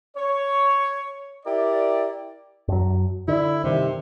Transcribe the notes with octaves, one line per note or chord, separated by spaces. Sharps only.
C#5
E4 G4 A#4 D5
F#2 F#3
D3 E4
G2 C3 D#3